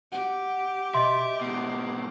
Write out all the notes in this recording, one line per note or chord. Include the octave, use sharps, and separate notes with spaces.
G4 F#5
B2 D#5 E5 C6
G#2 B2 C7